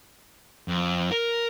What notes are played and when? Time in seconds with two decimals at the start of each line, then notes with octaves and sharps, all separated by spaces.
0.68 F2
1.11 A#4